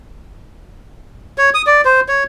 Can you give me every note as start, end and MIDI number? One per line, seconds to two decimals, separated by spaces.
1.38 1.50 73
1.54 1.62 87
1.67 1.81 74
1.85 2.01 72
2.08 2.24 73